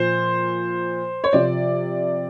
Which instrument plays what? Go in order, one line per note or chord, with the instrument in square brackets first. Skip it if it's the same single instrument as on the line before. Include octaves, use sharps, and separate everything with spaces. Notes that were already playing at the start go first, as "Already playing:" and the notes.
Already playing: [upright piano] A#2 F3 C5
C#5
C3 F3 D5